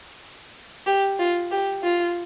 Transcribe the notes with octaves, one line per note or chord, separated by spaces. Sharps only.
G4
F4
G4
F4